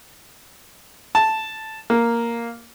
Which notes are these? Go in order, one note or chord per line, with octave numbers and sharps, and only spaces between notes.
A5
A#3